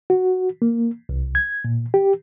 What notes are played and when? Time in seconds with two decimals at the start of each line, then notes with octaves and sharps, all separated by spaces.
0.10 F#4
0.62 A#3
1.09 C2
1.35 G#6
1.65 A#2
1.94 G4